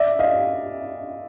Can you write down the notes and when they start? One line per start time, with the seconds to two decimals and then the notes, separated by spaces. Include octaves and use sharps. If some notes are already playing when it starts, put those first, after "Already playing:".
Already playing: D5 E5
0.19 D#5 F5